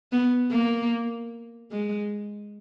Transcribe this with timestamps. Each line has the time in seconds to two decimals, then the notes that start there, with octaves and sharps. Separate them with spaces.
0.12 B3
0.51 A#3
1.71 G#3